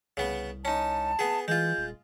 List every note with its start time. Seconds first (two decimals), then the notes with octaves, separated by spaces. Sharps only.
0.17 C2 C#3 B3
0.65 C#4 D#4 A5
1.19 B3 G#4
1.48 E3 G#3 F4 G6
1.77 D#1